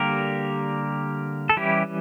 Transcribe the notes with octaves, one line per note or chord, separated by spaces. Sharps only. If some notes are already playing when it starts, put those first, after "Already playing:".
Already playing: D3 G3 A#3 G4 A#4
A4
E3 G3 C#4 E4 G4